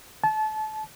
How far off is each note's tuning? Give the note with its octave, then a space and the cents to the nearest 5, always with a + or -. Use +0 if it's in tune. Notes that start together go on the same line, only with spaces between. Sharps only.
A5 -25